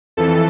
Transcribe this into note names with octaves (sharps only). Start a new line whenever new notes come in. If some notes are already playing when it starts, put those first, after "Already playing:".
F2 E3 A4